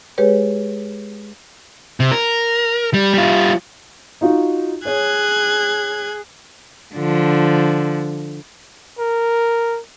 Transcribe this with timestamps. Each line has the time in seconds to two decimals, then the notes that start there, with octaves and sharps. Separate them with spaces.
0.18 G#3 G4 G#4 B4 C#5
2.00 C3
2.11 A#4
2.94 G3
3.14 G3 F4
4.21 D#4 F4 F#4
4.85 G#4 C#5 F#6 G#6
6.95 D3 F3
8.99 A#4